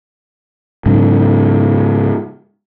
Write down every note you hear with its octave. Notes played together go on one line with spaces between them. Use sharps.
G#2 C#3 F#3